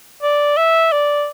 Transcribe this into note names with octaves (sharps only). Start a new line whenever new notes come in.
D5
E5
D5